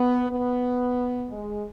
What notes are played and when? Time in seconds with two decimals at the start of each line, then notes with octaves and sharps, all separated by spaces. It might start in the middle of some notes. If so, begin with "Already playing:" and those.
Already playing: B3
0.30 B3
1.29 G#3